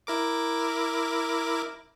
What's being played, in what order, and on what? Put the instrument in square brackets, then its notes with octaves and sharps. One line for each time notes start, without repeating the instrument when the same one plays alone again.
[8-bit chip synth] E4 A#4 D6